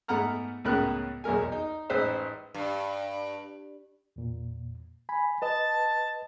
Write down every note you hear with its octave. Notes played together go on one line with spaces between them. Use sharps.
G#2 A3 B3 F#5 A#5 F6
C#2 A2 C#3 B3 A#4 F#6
B1 E2 G#3 A#4 G#5
D#4
A1 G#3 D#4 B4 C5 E6
G2
E2 A#2
G#5 B5
B4 D#5 A5